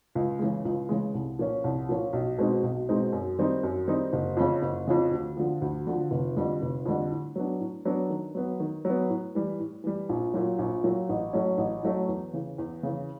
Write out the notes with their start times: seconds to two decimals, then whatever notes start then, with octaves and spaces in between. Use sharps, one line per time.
0.15 C#2
0.39 C#3 E3 G#3
0.65 C#2
0.89 C#3 E3 G#3
1.14 C2
1.39 A#2 F3 A#3 C#4
1.64 C2
1.89 A#2 F3 A#3 C#4
2.13 B1
2.38 B2 G#3 C4 D#4
2.63 B1
2.89 B2 G#3 C4 D#4
3.13 F#2
3.39 D#3 G3 C4 D#4
3.63 F#2
3.88 D#3 G3 C4 D#4
4.13 F#1
4.37 F2 C#3
4.62 F#1
4.87 F2 C#3
5.12 D2
5.37 D3 F3
5.62 D2
5.87 D3 F3
6.11 F1
6.37 F2 D3 G3
6.62 F1
6.86 F2 D3 G3
7.11 A2
7.36 F#3 B3 D4
7.60 A2
7.85 F#3 B3 D4
8.10 D#3
8.35 F#3 B3
8.60 D#3
8.85 F#3 B3
9.10 A2
9.35 E3 G3
9.60 A2
9.84 E3 G3
10.09 A#1
10.34 A#2 F#3
10.59 A#1
10.84 A#2 F#3
11.09 A1
11.33 A2 F#3 A3 C#4
11.58 A1
11.83 A2 F#3 A3 C#4
12.08 E2
12.34 C#3 E3
12.58 E2
12.83 C#3 E3